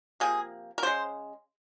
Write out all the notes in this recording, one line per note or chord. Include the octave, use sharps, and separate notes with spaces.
C3 F3 A#3 G#4
A#4
C#3 G#3 C5